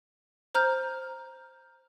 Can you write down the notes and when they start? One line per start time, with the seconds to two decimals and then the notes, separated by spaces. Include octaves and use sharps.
0.55 C5 A#5 F6 G6